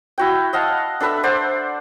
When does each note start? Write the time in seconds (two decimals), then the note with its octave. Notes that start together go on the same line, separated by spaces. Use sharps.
0.18 E4 F#4 G5
0.53 D#5 F5 F#5 A5
1.00 D4 A4 B4 E5
1.23 C5 D5 F#5